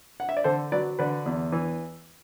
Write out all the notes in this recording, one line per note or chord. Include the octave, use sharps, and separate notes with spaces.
F#5
E5
D5
D3 A4 C5
F#3 B4 D5
D3 B4 D5
E2
E3